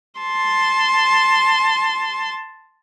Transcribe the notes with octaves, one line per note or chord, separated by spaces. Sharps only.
A5 C6